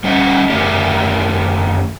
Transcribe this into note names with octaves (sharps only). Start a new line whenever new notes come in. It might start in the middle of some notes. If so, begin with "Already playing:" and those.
G3 C#4 D#5 F#5
F#2 D#3 A3 G4 A#4 D5